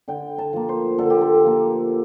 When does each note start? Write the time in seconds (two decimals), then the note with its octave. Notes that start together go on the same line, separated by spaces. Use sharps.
0.08 D3 G5
0.38 A5
0.53 F3 A#3
0.69 C5
0.98 D3 A4
1.10 G4
1.21 A4
1.44 F3 A#3